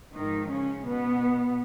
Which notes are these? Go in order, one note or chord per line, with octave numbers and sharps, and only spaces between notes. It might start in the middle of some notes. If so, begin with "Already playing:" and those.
G#2 D#3 F3 G#3 D#4
C#3 C#4
B2 B3